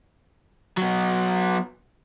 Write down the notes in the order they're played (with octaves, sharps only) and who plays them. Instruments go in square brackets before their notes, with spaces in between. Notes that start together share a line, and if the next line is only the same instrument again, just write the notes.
[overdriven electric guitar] F#3 B3